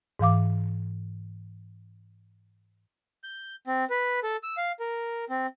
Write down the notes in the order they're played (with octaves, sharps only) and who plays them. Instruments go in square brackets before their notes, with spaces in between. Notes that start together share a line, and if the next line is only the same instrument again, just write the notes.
[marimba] G#2 E3 F5 D6
[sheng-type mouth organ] G6
C4
B4
A4
E6
F5
A#4
C4